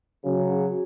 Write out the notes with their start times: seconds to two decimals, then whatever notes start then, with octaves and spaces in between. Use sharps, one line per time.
0.25 C#3 F#3